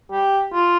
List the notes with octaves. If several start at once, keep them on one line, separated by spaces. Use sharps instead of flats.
G4
F4